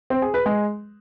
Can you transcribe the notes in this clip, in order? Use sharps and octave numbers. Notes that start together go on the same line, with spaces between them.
C4
G#4
B4
G#3